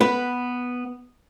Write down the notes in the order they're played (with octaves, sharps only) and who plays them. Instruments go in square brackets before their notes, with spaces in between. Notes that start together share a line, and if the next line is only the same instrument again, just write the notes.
[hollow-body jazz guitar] B3 B4